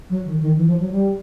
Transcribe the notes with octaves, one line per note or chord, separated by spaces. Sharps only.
F#3
D#3
D#3
E3
F3
F#3
G3